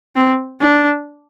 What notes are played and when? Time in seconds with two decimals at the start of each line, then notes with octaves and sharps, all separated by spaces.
0.15 C4
0.60 D4